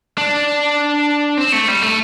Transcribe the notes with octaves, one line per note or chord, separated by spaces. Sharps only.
D4
C4
A3
G3
A3